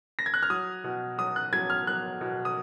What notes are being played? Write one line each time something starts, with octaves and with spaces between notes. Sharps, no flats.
A#6
G#6
F#6
F6
F#3 D#6
B2
F#3 D#6
F#6
F#3 G#6
F6
F#3 F#6
B2
D#6